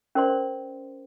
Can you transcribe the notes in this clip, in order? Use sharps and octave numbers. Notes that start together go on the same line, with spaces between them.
C#4 A#4 C5 D5 C6